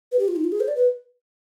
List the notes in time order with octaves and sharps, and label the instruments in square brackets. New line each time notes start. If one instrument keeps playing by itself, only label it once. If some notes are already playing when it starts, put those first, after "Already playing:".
[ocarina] B4
G4
F4
D#4
F4
G#4
C5
D5
B4